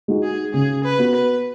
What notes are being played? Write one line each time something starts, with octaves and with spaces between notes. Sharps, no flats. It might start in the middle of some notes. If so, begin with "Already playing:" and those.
G#3 D#4 F#4
G#4
C#3 G#4
B4
B3 F#4
B4